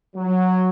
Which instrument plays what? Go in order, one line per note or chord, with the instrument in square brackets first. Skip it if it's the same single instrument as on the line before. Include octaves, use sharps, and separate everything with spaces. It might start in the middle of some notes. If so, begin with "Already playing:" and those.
[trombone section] F#3